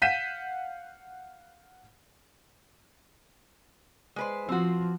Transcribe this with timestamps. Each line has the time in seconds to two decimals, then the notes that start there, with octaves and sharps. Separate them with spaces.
0.02 F5 F#5 G6 B6 D#7 E7
4.16 G#3 B4 C5
4.49 F3 C4 F#4